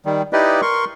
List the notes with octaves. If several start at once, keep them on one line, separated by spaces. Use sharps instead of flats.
D#3 G3
D#4 E4 G4 B4 D5 D#5
A#4 C6 C#6